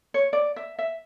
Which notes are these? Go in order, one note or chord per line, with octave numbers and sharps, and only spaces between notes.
C#5
D5
E5
E5